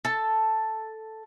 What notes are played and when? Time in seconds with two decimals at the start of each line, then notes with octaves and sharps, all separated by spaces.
0.05 A4 A5